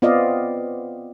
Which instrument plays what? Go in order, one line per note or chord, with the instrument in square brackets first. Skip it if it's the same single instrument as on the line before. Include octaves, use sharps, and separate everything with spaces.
[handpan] B3 C4 F4 D5 D#5 F5